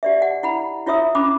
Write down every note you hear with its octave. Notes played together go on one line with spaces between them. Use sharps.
G4 D5 E5
F#5
E4 F#5 B5
E4 F4 C#5 E5 D#6 E6
C#4 F4 B5 D6